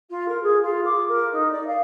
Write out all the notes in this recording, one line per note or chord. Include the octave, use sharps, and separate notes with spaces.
F4
A#4
G#4
F4
D6
A#4
D#4
D5
F5